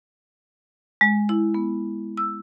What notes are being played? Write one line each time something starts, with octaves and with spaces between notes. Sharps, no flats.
G#3
E4
B3
E6